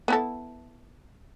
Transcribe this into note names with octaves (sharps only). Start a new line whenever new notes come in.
B3 E4 A4